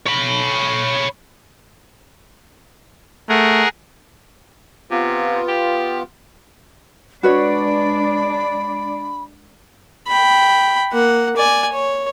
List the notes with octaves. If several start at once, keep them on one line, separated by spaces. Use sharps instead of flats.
C#5 B5
A3 G#4 A#4 F#5
C3 B3 F4
G4
G#3 D4 F#4 B4 C#5 D5 B5
G5 B5
A#3 F#5
D5 G#5
C#5